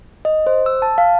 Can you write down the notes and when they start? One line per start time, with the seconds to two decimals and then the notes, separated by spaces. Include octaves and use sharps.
0.25 D#5
0.47 C5
0.66 E6
0.82 A5
0.98 F5